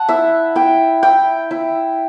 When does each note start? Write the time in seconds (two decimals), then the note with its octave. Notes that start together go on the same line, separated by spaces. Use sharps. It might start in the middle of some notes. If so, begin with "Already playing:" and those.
Already playing: F#5 A5
0.09 E4 E5
0.55 E4 G5
1.03 E4 G5
1.51 E4